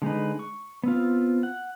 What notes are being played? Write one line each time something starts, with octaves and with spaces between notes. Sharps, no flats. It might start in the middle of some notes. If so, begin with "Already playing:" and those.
D3 G#3 D#4 B4
C#6
B3 C4 F4
F#5